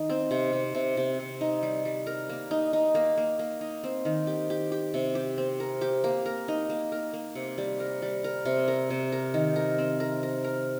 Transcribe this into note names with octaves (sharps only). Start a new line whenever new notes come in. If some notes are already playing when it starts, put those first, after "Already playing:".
Already playing: D#3 D#4
C4
C3
C3
C3
C3
C3
D#4
G3
G3
A#4
A#3
D#4
D#4
A#3
A#3
A#3
D#4
C4
D#3
G4
G4
G4
C3
G4
C4
A#4
G4
A#3
A#4
D#4
A#3
A#4
A#3
C3
G3
A#4
G3
A#4
C3
A#4
C3
A#4
D#3
A#4
C4
A#4
A#4
A#4